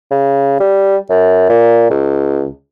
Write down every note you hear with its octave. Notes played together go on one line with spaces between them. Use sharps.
C#3
G3
F#2
A#2
C#2